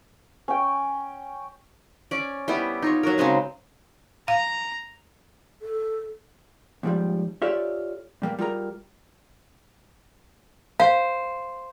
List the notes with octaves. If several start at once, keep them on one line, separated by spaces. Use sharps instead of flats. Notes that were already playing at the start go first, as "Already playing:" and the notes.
C#4 G5
C#4 D5
G3 B3 E4 G4
D#4 F4 C#5
F#3 F#4 A#4
C#3 F#3 G#3 C4
F5 A#5
A4
D#2 G#2 F3 G3
F4 G4 A4 C#5 D5 E5
A#2 G3 A#3
G3 F4 G#4 A#4 A#5
C5 F5